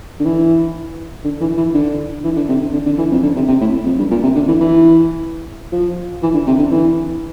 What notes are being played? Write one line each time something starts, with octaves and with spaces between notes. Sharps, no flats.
D3
E3
D3
E3
E3
D3
E3
D3
C3
D3
D3
D3
E3
F2
D3
C3
C3
A2
F2
G2
A#2
C3
D3
E3
E3
F3
E3
D3
C3
D3
E3